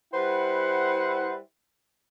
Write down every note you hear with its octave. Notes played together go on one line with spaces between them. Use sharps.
G3 E4 B4 C5 F#5